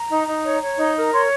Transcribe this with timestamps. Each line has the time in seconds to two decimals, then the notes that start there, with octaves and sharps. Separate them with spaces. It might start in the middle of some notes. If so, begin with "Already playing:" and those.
Already playing: A#5
0.10 D#4
0.27 D#4
0.44 C#5
0.61 C#5
0.78 D#4
0.95 A#4
1.13 C#5 C6